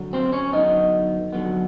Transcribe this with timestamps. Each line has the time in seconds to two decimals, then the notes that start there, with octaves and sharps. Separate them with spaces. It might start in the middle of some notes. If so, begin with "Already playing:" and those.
Already playing: D3 F#3
0.13 C4 C5
0.32 C#4 C#5
0.52 D3 F#3 B3 D#4 D#5
1.33 D3 F#3 B3